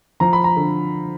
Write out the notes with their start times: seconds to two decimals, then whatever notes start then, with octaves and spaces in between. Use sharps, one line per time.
0.20 F3 A#5
0.33 B5
0.44 A#5
0.57 D3